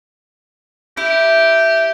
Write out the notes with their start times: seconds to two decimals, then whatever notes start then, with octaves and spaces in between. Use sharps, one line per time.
0.97 E4 G4